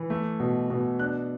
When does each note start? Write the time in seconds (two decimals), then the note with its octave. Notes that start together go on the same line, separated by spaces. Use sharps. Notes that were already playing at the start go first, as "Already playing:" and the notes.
Already playing: E3
0.10 A3
0.40 B2
0.70 B2
0.99 D4 F#6